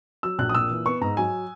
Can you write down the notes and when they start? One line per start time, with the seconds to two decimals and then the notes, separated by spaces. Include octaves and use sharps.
0.23 F#3 E6
0.39 A#1 F#6
0.49 D#6
0.55 A#2 E6
0.70 E3
0.86 B3 C#6
1.01 G#2 A#5
1.17 F#3 G#5